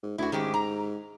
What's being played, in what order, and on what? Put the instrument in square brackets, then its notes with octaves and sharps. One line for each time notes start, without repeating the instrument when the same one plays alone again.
[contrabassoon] G#2
[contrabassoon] D2 [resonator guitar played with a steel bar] E4 F#4
[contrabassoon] G#2 [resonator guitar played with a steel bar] D#3 C#4 G4
[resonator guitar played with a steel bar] A#5